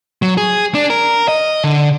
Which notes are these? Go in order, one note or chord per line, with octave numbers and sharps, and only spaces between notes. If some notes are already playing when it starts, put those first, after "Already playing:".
F#3
G#4
D4
A#4
D#5
D3